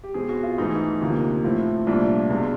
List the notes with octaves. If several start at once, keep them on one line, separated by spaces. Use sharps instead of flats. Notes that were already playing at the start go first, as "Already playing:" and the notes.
G4
B2 G#3 C4 G#4
F#4
F4
G#2 E3 A3 D#4
D2 C3 F3 A#3
A2 F3 A3 C4
C2 A#2 F3 A3 D4
C#2 B2 G#3